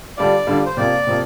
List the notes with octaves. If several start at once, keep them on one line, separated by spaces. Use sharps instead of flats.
D3 G3 D4 F4 D5
D3 G3 D4 F4
C5
C3 F3 A#3 D5
C3 F3 A#3